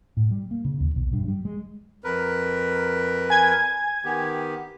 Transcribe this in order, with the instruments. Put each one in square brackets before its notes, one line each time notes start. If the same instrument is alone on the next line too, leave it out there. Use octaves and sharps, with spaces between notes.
[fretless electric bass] A2
G3
A#3
C#3
D#2
B1
G2
G3
G#3
[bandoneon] F2 A#4 B4
[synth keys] G#5 G#6
[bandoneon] D#3 B3 G4